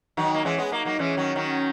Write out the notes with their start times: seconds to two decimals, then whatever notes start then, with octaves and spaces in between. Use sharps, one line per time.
0.17 D#3 F#3 D#4
0.34 A#3
0.45 E3 G#3 C#4
0.58 G#3 B3
0.72 F#3 A#3 D#4
0.85 F#3 A#3
0.99 E3 G#3 C#4
1.17 D#3 F#3
1.35 D#3 F#3